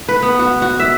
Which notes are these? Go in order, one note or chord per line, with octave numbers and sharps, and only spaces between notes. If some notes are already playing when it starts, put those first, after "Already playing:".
B4
B3
F#4
F#4
E5